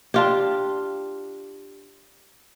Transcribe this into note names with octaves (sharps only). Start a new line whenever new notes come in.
D4 F4 G4